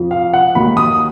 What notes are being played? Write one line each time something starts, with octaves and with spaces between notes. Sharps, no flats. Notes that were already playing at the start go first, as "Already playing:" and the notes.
Already playing: F2 F3
F5
F#5
D#2 D#3 F#3 B5
D#6